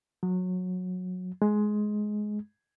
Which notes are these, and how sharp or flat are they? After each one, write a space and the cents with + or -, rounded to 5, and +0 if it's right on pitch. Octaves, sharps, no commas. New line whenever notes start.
F#3 -20
G#3 +15